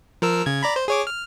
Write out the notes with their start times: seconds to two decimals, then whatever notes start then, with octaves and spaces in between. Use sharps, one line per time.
0.22 F3 A#4 E6
0.46 C#3 G#6
0.63 D5 A#5 B5
0.76 C5
0.88 G#4 C#5 D6
1.07 F6